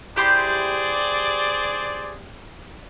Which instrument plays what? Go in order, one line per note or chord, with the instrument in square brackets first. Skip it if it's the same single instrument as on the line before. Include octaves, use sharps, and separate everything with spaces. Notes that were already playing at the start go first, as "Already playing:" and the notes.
[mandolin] E4 G4 C6 [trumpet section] G#4 C5 D5